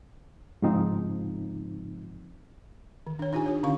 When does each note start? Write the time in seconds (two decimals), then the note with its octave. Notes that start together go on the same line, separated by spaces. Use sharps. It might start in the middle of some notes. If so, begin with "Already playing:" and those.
0.62 G#2 C#3 F3 C4 D#4
3.07 D#3
3.19 D4 C#5
3.33 D4 D#4 F4 G4 G#5
3.46 G4 C#5
3.63 D3 C#4 F5 C#6